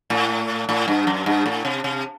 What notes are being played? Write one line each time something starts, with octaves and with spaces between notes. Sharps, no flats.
A2
A2
G2
F#2
G2
A2
C3
C3